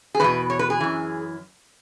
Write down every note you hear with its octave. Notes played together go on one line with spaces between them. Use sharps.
G#4
E2 B2 B4
C#5
B4
G#4
F#2 E3